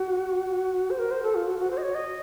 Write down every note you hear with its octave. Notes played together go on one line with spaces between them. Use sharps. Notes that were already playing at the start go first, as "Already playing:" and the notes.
Already playing: F#4
C5
A#4
C5
A4
F4
F#4
F#4
C5
D#5
C#5
D#5